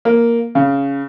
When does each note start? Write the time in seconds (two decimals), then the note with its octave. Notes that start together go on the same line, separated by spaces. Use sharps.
0.05 A#3
0.55 C#3